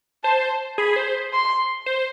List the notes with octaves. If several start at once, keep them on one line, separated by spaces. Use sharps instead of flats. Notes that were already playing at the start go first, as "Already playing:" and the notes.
C5 A5
G#4 B5
C5
C6
C5